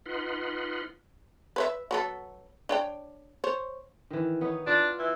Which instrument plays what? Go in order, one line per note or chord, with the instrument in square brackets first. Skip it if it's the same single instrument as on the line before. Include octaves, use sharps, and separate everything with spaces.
[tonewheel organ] D#4 F4 B4 F#5 C6
[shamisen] B4 C5 E5
F#3 B3 A4
D4 C#5 G5
C5 C#5
[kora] D#3 E3
B3 D#4 C#5
[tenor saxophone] D4 [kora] F4 D5
[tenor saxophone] E3